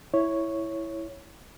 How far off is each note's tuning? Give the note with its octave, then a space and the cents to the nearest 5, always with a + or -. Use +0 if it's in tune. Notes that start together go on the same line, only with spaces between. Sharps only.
E4 +0 C#5 +0